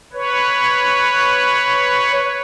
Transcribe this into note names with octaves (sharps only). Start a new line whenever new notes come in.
B4 C#5